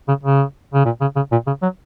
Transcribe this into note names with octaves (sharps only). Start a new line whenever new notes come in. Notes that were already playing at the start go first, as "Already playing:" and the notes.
C#3
C#3
C#3
A#2
C#3
C#3
A#2
C#3
F#3